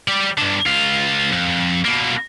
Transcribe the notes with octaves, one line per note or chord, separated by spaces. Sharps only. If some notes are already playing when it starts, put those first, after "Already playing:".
G3 D5
G2 D3
C#2 F4
F2
B2 A#3